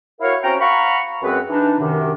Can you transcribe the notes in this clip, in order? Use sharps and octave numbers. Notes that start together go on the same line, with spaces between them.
E4 F#4 A#4 C#5 F5
C4 C#4 F#4 G5 A#5
F5 F#5 A#5 B5 C#6
F#2 G#3 C4 B4
E3 D4 D#4
F#2 C3 D#3